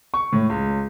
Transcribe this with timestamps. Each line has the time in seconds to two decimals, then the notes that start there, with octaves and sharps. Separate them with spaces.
0.14 C#6
0.32 A2
0.49 C#2